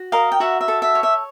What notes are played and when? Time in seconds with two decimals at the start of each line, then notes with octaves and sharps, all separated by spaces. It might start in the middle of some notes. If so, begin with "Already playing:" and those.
Already playing: F#4
0.12 A#4 D#5 F5
0.32 G5
0.40 F#4 E5 F#5
0.61 E5
0.68 A4
0.82 E5
0.95 C#5
1.03 E5